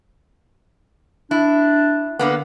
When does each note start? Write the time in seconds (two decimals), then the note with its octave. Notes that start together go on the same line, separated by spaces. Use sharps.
1.31 D4 E4
2.19 D3 A#3 B3